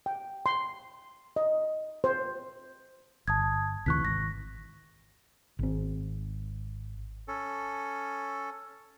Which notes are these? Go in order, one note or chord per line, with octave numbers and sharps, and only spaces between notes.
G5
C6
D#5
C5
G1 A5 D#6 G#6
D2 C3 E3 C#6 F#6 B6
G#1 A#6
G#1 C4
C#4 A4